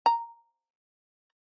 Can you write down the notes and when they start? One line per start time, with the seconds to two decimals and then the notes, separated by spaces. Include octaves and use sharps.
0.06 A#5